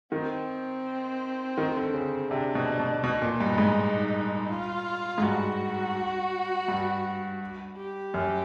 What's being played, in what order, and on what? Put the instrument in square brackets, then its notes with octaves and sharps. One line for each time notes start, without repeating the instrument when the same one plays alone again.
[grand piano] D#3 [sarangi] C4
[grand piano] D#3
D3
C#3
[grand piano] C3 [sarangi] D4
[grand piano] B2
B2
[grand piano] B2 [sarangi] D#4
[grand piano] A#2
G2
G#2
[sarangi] F4
[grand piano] G#2
[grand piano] G2 [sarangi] F#4
[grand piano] G2
[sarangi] G4
[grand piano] F#2